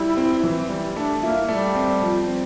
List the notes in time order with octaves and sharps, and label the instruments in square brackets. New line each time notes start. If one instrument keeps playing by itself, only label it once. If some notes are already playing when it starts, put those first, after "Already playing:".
Already playing: [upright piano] G3 [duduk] E4
[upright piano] C4
E3
G3
[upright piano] A3 [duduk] D4
[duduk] A#3 [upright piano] E4
[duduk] G3 [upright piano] A3
[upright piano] C4
F3
C4